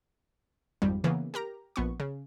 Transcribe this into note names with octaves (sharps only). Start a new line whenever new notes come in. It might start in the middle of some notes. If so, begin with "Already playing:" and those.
G#1 F2 G3
C#3 E3 A#3 B3
G4 A#4 A#5
A#1 B3 C#6
C#3